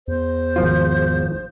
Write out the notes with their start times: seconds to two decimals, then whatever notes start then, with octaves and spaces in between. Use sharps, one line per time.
0.08 E2 C5
0.56 G#1 F3 F4